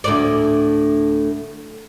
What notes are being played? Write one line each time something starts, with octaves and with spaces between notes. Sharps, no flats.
D2 A2 D5